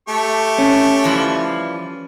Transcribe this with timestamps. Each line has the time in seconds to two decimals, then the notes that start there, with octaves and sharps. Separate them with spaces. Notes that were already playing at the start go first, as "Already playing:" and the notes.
0.08 A3 G4 C#6
0.58 C#4
1.04 E3 F3 G3